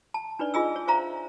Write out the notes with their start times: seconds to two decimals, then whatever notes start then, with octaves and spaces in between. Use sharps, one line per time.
0.14 A5
0.39 D4 D#4 B4 D5
0.54 F4 G#4 D#5 G#5 E6
0.76 C#5
0.88 C5 D5 E5 F5 A#5